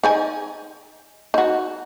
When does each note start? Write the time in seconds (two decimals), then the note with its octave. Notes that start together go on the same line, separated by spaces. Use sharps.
0.03 D#4 D5 G#5
1.34 D#4 F#4